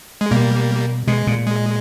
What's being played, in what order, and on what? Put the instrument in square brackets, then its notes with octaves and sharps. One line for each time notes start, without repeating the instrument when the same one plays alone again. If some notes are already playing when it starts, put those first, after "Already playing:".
[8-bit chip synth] G#3
[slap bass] B2 [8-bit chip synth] G3 A#3
[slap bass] B2 [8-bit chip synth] G#3
[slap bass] A#2
[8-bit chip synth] G#3